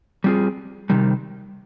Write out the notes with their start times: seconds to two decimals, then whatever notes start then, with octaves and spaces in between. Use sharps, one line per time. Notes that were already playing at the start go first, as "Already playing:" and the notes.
0.24 G3 C4 F4 G#4
0.90 C3 D#3 G3